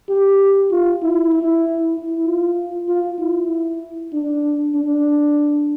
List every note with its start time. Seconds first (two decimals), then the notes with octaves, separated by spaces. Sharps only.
0.09 G4
0.71 F4
1.03 E4
1.34 E4
1.96 E4
2.26 F4
2.89 F4
3.19 E4
4.13 D4
4.75 D4